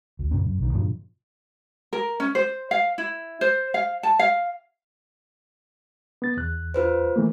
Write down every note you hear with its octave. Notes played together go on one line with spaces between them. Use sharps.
D2
F#2 A#2 C#3 C4
F#2
B1 D#3
G2 A#2 D3 F3
A#4
C#4
C5
F5
E4
C5
F5
A5
F5
B3 A6
E2 F#6
F4 B4 C5
E3 A3 A#3